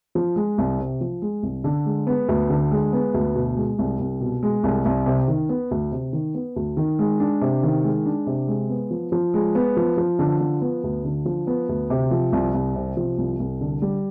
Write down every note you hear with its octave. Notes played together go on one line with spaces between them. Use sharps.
F3
G#3
C2
C3
F3
G#3
C2
D3
G#3
B3
D2
D3
G#3
B3
D2
B2
G#3
C2
C2
B2
G#3
C2
C2
C3
D#3
B3
D2
C3
D#3
B3
D2
D#3
G#3
D4
C3
D#3
G#3
D4
C3
G#3
B3
F3
F3
G#3
B3
F3
F3
D3
F3
B3
D2
D3
F3
B3
D2
C3
F3
C2
C2
C3
F3
C2
C2
D3
G3